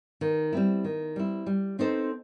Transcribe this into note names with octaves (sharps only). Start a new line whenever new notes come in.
D#3
G3 C4 E4
D#3
G3 C4 E4
G3
C4 D#4 A4 C5